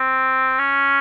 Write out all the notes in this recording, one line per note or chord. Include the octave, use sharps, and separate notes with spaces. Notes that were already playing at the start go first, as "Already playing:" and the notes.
Already playing: C4
C#4